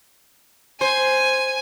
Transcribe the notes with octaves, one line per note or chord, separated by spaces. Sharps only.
C5 G#5